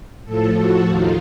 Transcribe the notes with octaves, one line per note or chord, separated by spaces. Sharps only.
A2 F3 A4
F#4
D#2 D#3 F4